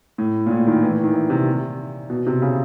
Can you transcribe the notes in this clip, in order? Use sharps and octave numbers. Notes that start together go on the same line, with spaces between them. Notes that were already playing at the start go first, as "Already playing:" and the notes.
A2
A#2
A2
D#3
E3
D#3
E3
C3
B2
C3
C#3